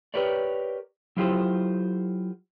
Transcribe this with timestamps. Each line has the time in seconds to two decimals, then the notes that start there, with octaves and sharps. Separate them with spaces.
0.14 G4 A#4 B4 C#5 D5
1.17 F#3 E4 F4 G4 A4 C5